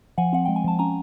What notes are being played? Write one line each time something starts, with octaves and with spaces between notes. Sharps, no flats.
F3 F#5 G#5
C4 F#5
G#3 G5
G#5
F3 A5
C#4 G#5 A#5